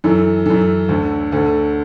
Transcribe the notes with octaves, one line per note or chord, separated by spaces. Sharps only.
F#2 E3 A4
F#2 E3 A4
D2 D3
D2 D3 A4